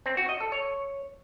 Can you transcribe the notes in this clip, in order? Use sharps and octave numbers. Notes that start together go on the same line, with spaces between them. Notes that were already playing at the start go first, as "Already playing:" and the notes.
C4
F#4
D#5
A4
C#5